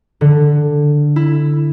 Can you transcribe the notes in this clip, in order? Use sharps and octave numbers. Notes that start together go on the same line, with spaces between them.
D3
E4